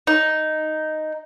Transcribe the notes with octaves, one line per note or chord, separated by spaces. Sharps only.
D#4